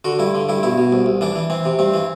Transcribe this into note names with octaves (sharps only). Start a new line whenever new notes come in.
D3 F#4
G2 E4
D3
G2 E4
B2 E4
B2
C2
C2
E3 D4
E3
E3 C4
C3
G2 C4
E3